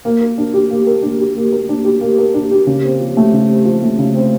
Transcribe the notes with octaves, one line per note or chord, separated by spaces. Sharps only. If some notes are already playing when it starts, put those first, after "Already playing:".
A#3
A#4
D4
G4
A#3
A#4
D4
G4
A#3
A#4
D4
G4
A#3
A#4
D4
G4
C#3
C4
F3
A3
C#3
C4
F3
A3
C#3
C4